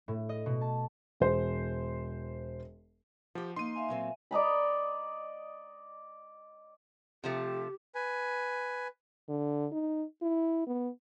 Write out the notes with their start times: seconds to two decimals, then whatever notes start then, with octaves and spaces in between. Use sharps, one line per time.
0.08 A2
0.29 D#5
0.46 B2
0.61 A5
1.20 E1 C5
3.35 F3 G4 F#5
3.56 A#3 D#4 C6 D#7
3.75 E5 F5 G#5
3.88 A#2 F#3 C4
4.31 D5 D#5 A#5 B5
7.24 C3 F3 A3 G4
7.95 B4 G#5
9.29 D3
9.72 D#4
10.22 E4
10.67 B3